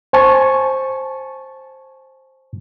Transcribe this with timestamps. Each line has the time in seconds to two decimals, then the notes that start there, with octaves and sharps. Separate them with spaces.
0.13 C5 G#5 A5 C#6